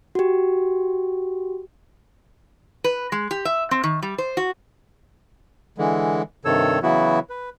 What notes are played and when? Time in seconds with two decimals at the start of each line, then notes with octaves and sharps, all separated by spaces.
0.15 F#4 G4
2.84 B4
3.12 G#3
3.31 G4
3.45 E5
3.71 C4
3.84 D#3
4.03 G3
4.18 C5
4.37 F#4
5.78 D3 E3 G#3
6.45 G2 C3 D#3 A4 C#5 E6
6.83 C#3 E3 F#3 B3 E4 F#4
7.30 B4